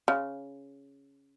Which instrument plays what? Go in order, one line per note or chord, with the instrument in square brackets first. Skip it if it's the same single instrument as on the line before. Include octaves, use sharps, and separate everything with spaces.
[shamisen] C#3